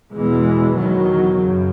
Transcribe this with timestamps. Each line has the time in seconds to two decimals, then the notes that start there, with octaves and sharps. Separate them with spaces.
0.14 E2 B2 E3 G#3
0.74 E2 B2 D#3 F#3
1.34 F#2 C#3